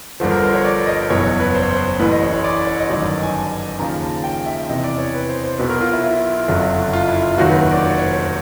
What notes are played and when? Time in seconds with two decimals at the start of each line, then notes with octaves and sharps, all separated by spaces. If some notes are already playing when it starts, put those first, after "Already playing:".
0.20 G1 G2 D3 F3 C5
0.31 A#4
0.43 C5
0.54 C#5
0.65 D5
0.87 D#5
1.10 F#1 E2 B2 F#3 C#5
1.25 C#5
1.40 B4
1.55 C5
1.62 C#5
1.70 C5
1.99 A1 A2 E3 B4
2.11 D#5
2.22 C#5
2.33 C#5
2.44 D5
2.67 C#5
2.79 D#5
2.89 G1 F#2 D#3 F#3 D5
3.00 D#5
3.23 G#5
3.34 A5
3.79 D#2 C#3 F3 A#5
4.02 A5
4.24 G5
4.46 E5
4.69 E2 C3 E3 D#5
4.84 D5
4.98 C#5
5.14 B4
5.29 C5
5.44 C5
5.58 B1 B2 F#3 B4
5.69 A#4
5.81 F4
5.93 E4
6.03 E4
6.48 F#1 F2 D3 F#3
6.93 F4
7.08 E4
7.23 F4
7.38 F1 D#2 D#3 F#3 F#4
7.49 B4
7.72 D5
7.83 C#5
7.99 C#5
8.05 C5